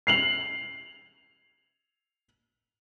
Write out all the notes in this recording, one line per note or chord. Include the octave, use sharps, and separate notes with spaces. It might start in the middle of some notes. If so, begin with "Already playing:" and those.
C7 F7 F#7